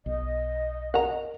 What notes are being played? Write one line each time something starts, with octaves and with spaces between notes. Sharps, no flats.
B1 D#5
A#4 F#5 A#5